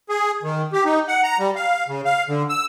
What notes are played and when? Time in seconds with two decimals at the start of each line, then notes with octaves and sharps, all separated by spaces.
0.09 G#4
0.43 D#3
0.73 G4
0.85 D#4
1.08 F#5
1.23 A#5
1.39 G3
1.56 F5
1.88 C#3
2.05 F5
2.28 D3
2.49 E6